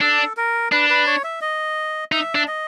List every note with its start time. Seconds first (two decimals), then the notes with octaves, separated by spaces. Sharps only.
0.01 D4 A4
0.37 A#4
0.72 D4 B4
0.90 B4
1.07 C#5
1.24 E5
1.41 D#5
2.12 D#4 E5
2.35 D4
2.48 D#5